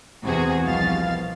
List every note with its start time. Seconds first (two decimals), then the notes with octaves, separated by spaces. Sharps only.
0.22 E2 C3 F#4 G#4
0.65 G1 C2 B2 F3 F5 A6